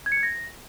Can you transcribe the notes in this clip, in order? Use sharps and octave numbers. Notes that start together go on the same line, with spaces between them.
G#6
C#7
G#6
A#6